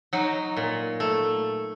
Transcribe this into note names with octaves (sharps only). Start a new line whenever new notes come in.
F#3 D#4
A#2
A3